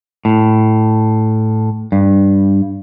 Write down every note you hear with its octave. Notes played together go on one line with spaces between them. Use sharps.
A2
G2